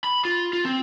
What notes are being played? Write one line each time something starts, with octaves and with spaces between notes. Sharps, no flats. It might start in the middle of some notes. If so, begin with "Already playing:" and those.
B5
F4
F4
C4